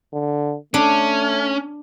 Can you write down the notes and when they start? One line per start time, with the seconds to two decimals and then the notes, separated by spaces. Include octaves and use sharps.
0.14 D3
0.74 A3 C#4 D4